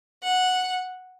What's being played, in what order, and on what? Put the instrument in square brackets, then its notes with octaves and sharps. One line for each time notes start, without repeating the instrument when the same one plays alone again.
[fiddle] F#5